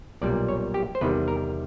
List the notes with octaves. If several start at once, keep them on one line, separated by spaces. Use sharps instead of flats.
B1 A#2 G3 D5
C#5
G4
C5
E2 C3 D#3 G3 B4
A#4